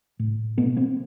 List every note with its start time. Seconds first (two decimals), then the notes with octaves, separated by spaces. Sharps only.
0.19 A2
0.57 B2 A3 B3
0.77 A#3 C4